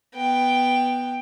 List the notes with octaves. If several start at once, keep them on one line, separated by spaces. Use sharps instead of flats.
B3 G5